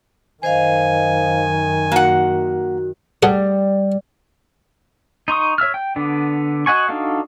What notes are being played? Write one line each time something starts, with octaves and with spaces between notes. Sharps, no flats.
F#2 D#3 C5 D#5 F5 G#5
A#3 F#4 F#5
G3 G#4 A4 F#5
D#4 C6 C#6 D#6
C#5 E5 E6 F6
G5
D3 B3 D4
F#4 D#5 F#5 G#5 C#6
D4 D#4 F#4 A4 F5